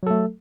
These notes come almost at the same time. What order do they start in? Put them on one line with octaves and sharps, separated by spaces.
F#3 A4 A3